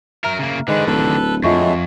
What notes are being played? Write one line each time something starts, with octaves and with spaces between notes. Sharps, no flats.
F#3 A#4 E5 A#5 F6
C#3 A#3
G#2 D3 D#3 G#3 B4
D1 A4 B4
F2 F#3 G#3 A3 F4 E5 C#6